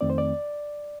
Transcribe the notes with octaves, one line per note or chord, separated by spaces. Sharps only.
F2 D#3 A3 C4 D5
C5
D5